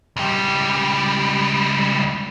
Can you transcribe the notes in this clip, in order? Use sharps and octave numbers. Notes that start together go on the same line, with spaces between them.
C#2 G3